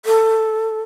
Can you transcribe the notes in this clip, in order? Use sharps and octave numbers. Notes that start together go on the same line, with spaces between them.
A4